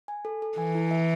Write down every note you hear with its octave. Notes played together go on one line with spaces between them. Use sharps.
G#5
A4
A4
E3 G#5
E4
E5